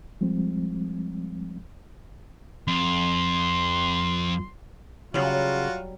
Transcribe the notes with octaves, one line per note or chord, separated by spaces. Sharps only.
F3 G3 G#3 C4
F2 C6
C#3 F#3 G3 F4 F#4